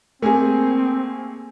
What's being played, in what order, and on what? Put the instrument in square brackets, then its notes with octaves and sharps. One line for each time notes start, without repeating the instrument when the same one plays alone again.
[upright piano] A3 G#4 [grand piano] A#3 G#5 [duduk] C4